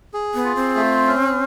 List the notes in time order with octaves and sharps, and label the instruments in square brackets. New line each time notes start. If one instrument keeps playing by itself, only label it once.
[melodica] G#4
[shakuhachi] B3
[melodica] F4
[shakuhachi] C4
[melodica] A3
C#4